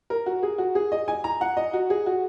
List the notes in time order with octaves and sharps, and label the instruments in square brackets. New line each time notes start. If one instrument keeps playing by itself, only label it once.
[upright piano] A#4
F#4
G#4
F#4
G#4
D#5
G#5
A#5
F#5
D#5
F#4
G#4
F#4